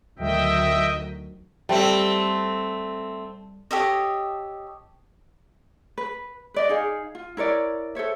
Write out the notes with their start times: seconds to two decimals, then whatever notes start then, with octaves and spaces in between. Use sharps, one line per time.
0.19 D2 D#3 F#3 D#5 E5 G5
1.69 G3 A3 C4
3.71 G4 A4 C#5 D#5
5.98 B4
6.54 B4 D5 D#5
6.69 D#4 G#4 F5
7.15 F4
7.37 E4 A#4 C#5 D5
7.95 A4 C5 C#5 E5